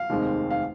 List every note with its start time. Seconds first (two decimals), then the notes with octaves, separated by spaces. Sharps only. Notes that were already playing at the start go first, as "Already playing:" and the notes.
Already playing: F5
0.10 F1 D#2 D#3 G#3 C4
0.51 F5